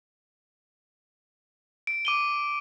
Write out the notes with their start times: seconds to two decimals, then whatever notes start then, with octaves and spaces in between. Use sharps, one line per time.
1.87 D7
2.05 D6 D#7 G7